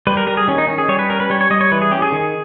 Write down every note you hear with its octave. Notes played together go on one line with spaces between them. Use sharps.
G3 B4
A#4
G3 A#4
G#4
D#3 C#4
D#4
C#4
G#4
G3 C#5
B4
C#4 A#4
B4
G3 C#5
C#5
G3 D#5
C#5
E3 B4
G#4
C#4 G4
G#4
D#3